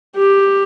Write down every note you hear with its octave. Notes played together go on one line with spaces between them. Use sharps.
G4